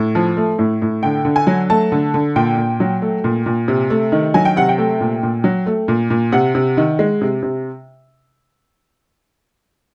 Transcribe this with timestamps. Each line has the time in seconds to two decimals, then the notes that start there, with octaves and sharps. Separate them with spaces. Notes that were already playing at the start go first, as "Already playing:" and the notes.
Already playing: A2
0.15 F3
0.37 A3
0.59 A2
0.82 A2
1.03 D3 G5
1.25 D3
1.36 G#5
1.47 F#3
1.70 A3 A5
1.92 D3
2.14 D3
2.36 A#2 G5
2.57 A#2
2.80 F#3
3.02 A3
3.24 A#2
3.46 A#2
3.68 C3
3.90 A3
4.12 D#3
4.34 F#3 G#5
4.45 G5
4.57 C3 F#5
4.69 G5
4.78 A3
5.01 A#2
5.23 A#2
5.44 F#3
5.66 A3
5.88 A#2
6.10 A#2
6.32 C3 F#5
6.55 C3
6.77 D#3
6.99 G#3
7.21 C3
7.43 C3